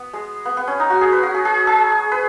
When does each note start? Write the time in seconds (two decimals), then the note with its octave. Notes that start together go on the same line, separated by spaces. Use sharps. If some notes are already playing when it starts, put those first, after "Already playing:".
Already playing: B3
0.14 G#3
0.45 B3
0.57 B3
0.67 C#4
0.80 D#4
0.90 F#4
1.01 G#4
1.12 B4
1.23 F#4
1.34 G#4
1.45 G#4
1.67 G#4
2.12 B4